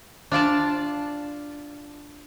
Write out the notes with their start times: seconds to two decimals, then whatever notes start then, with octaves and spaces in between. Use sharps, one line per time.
0.31 D4 F4 D5 A5